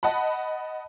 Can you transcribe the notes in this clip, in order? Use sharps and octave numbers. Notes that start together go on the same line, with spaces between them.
D#5 F#5 A5 B5